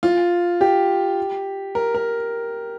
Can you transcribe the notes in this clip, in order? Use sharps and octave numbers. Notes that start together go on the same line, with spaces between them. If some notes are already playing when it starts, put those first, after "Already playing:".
F4
G4
A#4
A#4